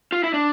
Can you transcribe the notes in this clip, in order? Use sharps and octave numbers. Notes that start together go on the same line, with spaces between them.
F4
E4
D4